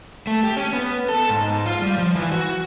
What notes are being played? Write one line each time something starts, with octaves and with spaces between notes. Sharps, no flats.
A3
G4
C#4
B3
A4
G#2
F4
G3
F3
E3
F#4